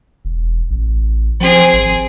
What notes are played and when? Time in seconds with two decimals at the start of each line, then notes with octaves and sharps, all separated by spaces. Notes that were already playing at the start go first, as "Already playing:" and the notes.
0.25 E1
0.70 A1
1.41 F3 C4 G#4
1.73 G#1